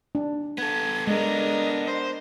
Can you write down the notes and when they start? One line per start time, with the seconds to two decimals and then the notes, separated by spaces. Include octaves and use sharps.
0.15 D4
0.58 B3 A4 G#6
1.07 G#3 D4 A#4 D#5
1.88 C5